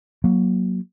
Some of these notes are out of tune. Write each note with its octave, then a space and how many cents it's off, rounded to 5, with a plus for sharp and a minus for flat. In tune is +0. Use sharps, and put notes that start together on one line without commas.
F#3 +0 A#3 +20